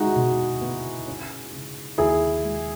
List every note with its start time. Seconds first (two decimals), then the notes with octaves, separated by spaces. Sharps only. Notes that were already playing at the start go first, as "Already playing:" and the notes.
Already playing: G#3 D#4 E4 F#4 G#4
0.16 B2
0.61 B3
1.07 C#4
1.53 C#3
1.98 D#2 E4 G#4
2.44 G#3